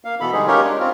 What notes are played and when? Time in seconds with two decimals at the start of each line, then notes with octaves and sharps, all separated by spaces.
0.05 A#3 F5
0.21 B2 E3 B3 A4 B5
0.33 D3 G3 G#3 D#4 G#4
0.47 C#4 D#4 F4 G4 A#4 C#5
0.64 G#3 D4
0.80 C4 F4